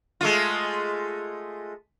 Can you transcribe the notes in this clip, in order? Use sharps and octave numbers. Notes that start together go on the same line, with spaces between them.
G#3 A3 F4